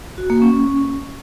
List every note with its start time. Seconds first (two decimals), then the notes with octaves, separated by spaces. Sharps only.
0.18 F#4
0.30 A#3
0.42 C#4